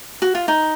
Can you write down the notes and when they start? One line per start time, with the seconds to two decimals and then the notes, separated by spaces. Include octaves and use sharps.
0.22 F#4
0.35 F4
0.48 D#4